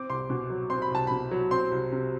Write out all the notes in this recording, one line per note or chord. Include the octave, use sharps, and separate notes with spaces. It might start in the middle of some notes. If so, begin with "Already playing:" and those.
Already playing: C4 D6
C2 C6
B2
F#3
C4 C6
B5
C2 A5
B2 B5
F#3
C4 C6
C2
C3